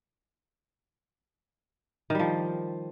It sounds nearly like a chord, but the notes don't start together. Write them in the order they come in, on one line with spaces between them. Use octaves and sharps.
D#3 G3 F3